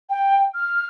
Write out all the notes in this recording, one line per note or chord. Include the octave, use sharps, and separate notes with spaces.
G5
F6